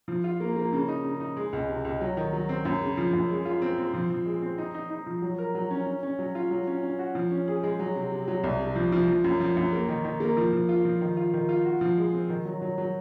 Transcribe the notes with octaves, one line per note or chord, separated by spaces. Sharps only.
F3
F4
A#3
A#3
C#3
D#4
C#3
D#4
G#3
C#2
C3
C#2
F#3
D#3
F#3
C4
F#2
C#3
F3
F#2
G#3
F4
C4
C4
F3
F3
G#3
C4
D#4
D#4
D#4
F3
F#3
A#4
F#3
C#4
C#4
C#4
F#3
F4
F#3
C#4
C#4
F#4
F3
C#4
G#4
G#3
F#3
C3
C3
F#3
C2
C3
F3
F3
F3
F#2
F3
F#2
A#3
D#3
D#3
A#3
F3
F3
F4
F3
D#3
F4
D#3
F4
F#4
F3
G#3
C4
D#3
F#3
F#3
F#3